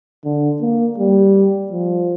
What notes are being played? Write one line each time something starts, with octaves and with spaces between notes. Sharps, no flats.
D3
A#3
G3
F3